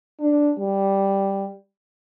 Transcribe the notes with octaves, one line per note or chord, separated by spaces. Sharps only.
D4
G3